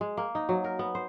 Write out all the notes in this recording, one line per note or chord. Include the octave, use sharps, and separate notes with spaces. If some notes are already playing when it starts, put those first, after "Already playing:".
G#3
A#3
D#4
F#3
A#4
B3
C5